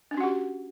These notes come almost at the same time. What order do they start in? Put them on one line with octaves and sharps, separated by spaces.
D4 C#4 F#4 F#5 G4